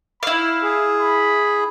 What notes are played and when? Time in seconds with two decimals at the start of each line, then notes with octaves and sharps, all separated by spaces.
0.23 E4 F5 B5
0.63 G#4
1.00 B5